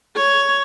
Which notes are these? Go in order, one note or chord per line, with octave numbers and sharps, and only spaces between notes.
C#5